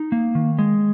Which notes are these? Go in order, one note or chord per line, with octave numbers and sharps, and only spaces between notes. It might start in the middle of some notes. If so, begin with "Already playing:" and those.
Already playing: D#4
A#3
D#3
G#3